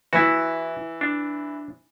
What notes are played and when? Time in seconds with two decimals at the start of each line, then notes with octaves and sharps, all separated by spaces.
0.13 E3 E4 F#4
1.01 D4